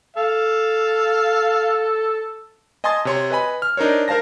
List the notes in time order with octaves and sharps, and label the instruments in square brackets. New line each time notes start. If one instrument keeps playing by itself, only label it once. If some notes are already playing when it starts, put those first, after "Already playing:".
[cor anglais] A4 [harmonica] F5
[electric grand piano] D#5 G#5 A5 C6 D#6 A6
C3 C#5 C6
B4 D#5 G#5 B5
F6
D4 D#4 A#4 C5 C#5
A#4 C5 F5 A5 A#6